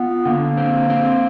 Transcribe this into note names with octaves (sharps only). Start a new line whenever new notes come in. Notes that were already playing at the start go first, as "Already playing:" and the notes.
Already playing: B3 F4
D3 A#3
C4
C4